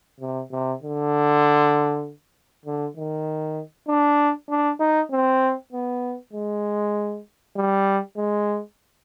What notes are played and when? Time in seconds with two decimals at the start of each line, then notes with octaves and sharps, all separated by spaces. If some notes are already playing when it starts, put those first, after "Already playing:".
0.20 C3
0.51 C3
0.82 D3
2.65 D3
2.97 D#3
3.88 D4
4.49 D4
4.80 D#4
5.11 C4
5.72 B3
6.33 G#3
7.56 G3
8.17 G#3